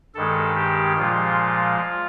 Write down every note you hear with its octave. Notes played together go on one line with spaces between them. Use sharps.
G2 D#3 G#3 A4
G4
A#2 F3 G#3 F4